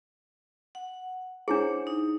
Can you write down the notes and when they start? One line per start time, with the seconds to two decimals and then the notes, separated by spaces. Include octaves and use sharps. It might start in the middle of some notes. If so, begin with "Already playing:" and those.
0.75 F#5
1.48 D4 E4 G#4 C5 C#5 F#5
1.87 D#4